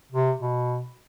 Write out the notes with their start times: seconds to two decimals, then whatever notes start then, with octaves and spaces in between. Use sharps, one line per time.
0.12 C3
0.40 B2